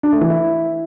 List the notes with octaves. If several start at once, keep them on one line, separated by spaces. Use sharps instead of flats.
D4
A3
E3
E4